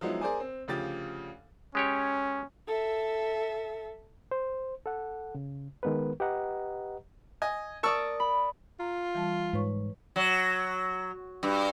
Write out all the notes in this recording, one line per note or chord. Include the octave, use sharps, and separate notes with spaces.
F3 F#3 G#3 B3 D#4 E4
G#4 A#4 C5 D5 G#5
C4
D2 C#3 F3 G4 A6
G#3 C#4 G4 C#5
A4 E5
C5
A4 F#5
C#3
D#3 G#3 B3 A#4 B4
G4 B4 D#5 F#5 A#5
D#5 G#5
A#4 D5 A5 C#6 D#6 E6
B5
F4 A#5
E3 G3 A5
G#2 B4 C#5 C#6
F#3
G2